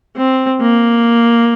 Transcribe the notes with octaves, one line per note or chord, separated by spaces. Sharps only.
C4
A#3